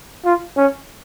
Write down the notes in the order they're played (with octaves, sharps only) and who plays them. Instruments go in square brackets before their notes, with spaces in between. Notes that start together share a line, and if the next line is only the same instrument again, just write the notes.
[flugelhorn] F4
C#4